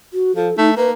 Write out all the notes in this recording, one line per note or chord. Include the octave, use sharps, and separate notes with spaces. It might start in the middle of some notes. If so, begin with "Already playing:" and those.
F#4
F3 A4
A3 D#4
A#3 B4